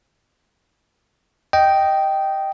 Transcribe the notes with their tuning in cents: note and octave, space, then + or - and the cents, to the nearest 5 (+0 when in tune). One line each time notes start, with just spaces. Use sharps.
D#5 +0 G5 -10